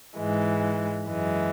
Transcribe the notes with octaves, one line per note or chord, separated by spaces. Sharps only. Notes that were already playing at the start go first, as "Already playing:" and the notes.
G#2 E3 G#3
F#2 E3 G#3